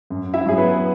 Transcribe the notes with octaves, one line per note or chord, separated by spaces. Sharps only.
F#2
E4 E5
F#3 G#4
B3 B4